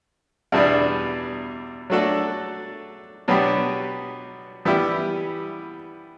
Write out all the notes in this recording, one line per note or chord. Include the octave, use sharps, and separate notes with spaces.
E2 B2 G3 B3 D4
F#3 A3 D4 F#4 A4
B2 F#3 B3 D4 G4
E3 G3 B3 E4 G4